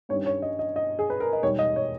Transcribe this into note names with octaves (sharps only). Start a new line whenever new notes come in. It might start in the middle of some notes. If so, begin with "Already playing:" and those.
G2 D#3 G3 C#4 C#5
C#5
D#5
D#5
D#5
G#4
B4
A#4
D#5
E1 D#2 D#3 G3 C#5
D#5
C#5